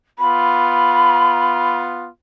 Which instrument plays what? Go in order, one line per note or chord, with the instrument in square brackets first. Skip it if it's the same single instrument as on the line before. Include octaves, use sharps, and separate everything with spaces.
[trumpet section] B3 F4 [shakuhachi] B5